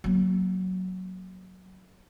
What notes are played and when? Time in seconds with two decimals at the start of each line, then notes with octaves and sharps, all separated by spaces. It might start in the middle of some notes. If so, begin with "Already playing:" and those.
0.04 F#3 A#3